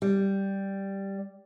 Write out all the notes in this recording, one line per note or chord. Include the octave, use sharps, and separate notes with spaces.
G3